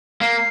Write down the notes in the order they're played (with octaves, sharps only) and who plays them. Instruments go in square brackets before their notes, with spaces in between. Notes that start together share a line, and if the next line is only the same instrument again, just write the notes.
[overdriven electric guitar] A#3 [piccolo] C7